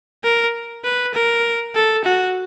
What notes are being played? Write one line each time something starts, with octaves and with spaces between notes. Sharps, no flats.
A#4
B4
A#4
A4
F#4